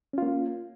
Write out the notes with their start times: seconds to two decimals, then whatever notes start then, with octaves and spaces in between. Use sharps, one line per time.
0.13 C#4
0.18 F4
0.22 A#3